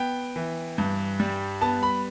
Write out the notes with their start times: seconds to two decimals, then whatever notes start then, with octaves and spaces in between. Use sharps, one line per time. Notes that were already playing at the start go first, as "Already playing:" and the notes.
Already playing: B3 G5
0.36 E3
0.78 G2
1.20 G3
1.61 B3 A5
1.83 B5